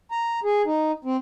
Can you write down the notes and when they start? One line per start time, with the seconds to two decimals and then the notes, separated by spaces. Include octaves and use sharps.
0.11 A#5
0.44 G#4
0.66 D#4
1.05 C4